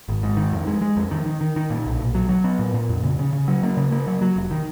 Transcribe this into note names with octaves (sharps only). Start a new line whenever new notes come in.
G#1
G#2
D#3
F2
G#3
G#3
F2
D#3
D#3
D#3
D#3
A#2
B1
B1
F#3
F#3
B3
A#2
A#2
F2
C#3
C#3
C#3
F#3
A#3
C#3
A#3
F#3
F#3
F1
D#3